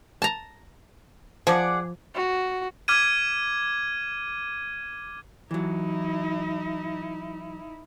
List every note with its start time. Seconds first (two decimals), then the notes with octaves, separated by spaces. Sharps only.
0.22 A5 A#5
1.47 F3 G#4 D5 F#5
2.15 F#4
2.88 D6 F6 G#6 D#7
5.51 E3 F#3 D#4 E4